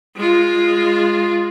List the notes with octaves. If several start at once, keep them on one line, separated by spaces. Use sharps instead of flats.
G#3 F4